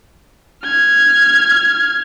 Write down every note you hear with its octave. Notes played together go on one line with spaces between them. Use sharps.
F6 G#6